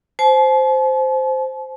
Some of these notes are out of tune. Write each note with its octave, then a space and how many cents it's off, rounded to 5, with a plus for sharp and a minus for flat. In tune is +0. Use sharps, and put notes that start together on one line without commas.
C5 -5 A5 -45